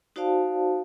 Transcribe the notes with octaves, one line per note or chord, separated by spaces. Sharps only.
D#4 F#4 C5 D5 F5 A5